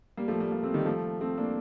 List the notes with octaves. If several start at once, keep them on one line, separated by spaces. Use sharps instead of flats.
G3 A#3
F3 A3
G3 A#3
G3 A#3
A3 C4
D#3 G3
F3 A3
A3 C4
A#3 D4